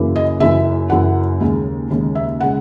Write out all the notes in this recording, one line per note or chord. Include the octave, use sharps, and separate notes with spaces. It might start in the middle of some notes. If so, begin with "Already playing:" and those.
Already playing: F#2 C#3 E3 A#3
D#5
F#1 F#2 E3 E5
F#1 F#2 E3 F#5
D#2 C#3 G#3
D#2 C#3 G#3
E5
C#3 G#3 F#5